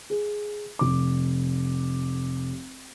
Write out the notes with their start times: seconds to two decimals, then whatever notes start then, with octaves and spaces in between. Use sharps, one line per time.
0.10 G#4
0.79 F1 D6